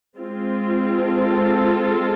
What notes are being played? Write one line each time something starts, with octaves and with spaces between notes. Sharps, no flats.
G#3 C4 F4
A4